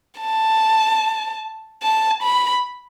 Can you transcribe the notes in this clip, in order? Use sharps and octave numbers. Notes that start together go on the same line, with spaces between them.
A5
A5
B5